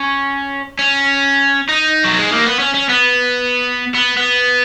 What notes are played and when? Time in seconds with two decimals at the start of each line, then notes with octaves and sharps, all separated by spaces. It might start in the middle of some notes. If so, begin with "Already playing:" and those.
Already playing: C#4
0.79 C#4
1.69 D#4
2.04 F#3
2.19 G#3
2.32 A#3
2.46 B3
2.59 C#4
2.74 C#4
2.89 B3
3.95 B3
4.17 B3